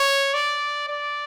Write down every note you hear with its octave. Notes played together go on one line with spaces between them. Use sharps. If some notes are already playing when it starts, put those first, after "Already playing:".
Already playing: C#5
D5
D5